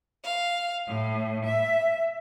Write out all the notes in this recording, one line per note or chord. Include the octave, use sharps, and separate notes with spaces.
F5
A2
E5